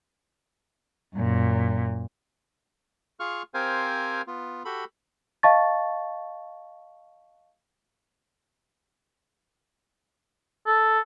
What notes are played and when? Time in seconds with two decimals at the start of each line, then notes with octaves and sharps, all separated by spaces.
1.15 F#2 A#2
3.20 F4 G#4 F5 C#6 F6
3.54 C4 G4 A#4 C5 F5 G#5
4.27 B3 F4
4.65 F#4 G4 A4 B5
5.43 D#5 F5 A5 C#6 A6
10.66 A4